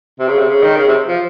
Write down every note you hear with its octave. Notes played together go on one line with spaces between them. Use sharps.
C3
C#3
C3
C#3
D#3
C#3
C3
F3